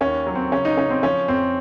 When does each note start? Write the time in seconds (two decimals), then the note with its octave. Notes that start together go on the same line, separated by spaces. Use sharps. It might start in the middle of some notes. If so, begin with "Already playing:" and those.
0.01 D#2 C#4
0.27 F#3
0.35 C4
0.52 C#3 C#4
0.65 D#4
0.77 C#3 C#4
0.90 C4
1.03 F3 C#4
1.28 F2 C4